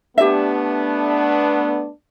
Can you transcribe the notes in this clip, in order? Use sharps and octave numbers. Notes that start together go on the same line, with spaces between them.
A3 B3 D4 G4 E5